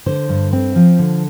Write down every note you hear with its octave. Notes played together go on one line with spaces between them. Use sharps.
D3 C5
G2
C4
F3
D3